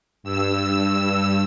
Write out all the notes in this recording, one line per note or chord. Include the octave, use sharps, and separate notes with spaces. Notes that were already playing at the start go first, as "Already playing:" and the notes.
G2 E6